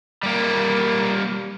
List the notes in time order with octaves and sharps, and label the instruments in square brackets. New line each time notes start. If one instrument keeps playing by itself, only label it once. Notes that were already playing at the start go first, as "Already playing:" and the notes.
[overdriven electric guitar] G3 A#3